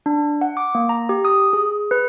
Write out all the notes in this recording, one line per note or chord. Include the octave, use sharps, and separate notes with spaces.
D4
F#5
D6
A#3
A#5
G4
D#6
G#4
B4